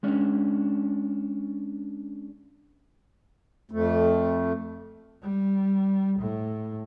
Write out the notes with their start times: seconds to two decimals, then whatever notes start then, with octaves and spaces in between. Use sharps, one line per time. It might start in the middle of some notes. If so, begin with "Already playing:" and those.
0.03 G#3 C#4 D4
3.71 F2 A3
5.23 G3
6.20 A2